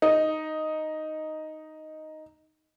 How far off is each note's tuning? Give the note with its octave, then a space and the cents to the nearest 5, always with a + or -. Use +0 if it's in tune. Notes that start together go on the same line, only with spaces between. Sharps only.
D#4 +0